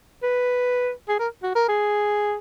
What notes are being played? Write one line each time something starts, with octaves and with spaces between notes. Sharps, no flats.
B4
G#4
A#4
F#4
A#4
G#4